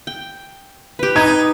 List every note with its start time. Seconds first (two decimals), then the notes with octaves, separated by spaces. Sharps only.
0.07 G5
0.99 G4 B4
1.16 D#4 G#6